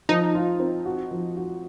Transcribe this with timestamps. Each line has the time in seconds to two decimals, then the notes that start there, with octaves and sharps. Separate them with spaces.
0.09 F3 D#4
0.35 F4
0.60 C4
0.85 F#4
1.11 F3
1.37 F#4